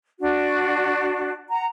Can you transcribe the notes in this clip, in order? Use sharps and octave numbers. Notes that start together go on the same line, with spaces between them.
D4 F#4
F#5 A#5